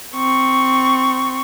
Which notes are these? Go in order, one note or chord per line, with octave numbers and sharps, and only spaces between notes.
C4 C#6